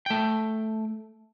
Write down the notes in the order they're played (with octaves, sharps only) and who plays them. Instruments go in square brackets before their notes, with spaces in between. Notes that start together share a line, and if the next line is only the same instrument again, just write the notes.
[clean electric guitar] A3 G5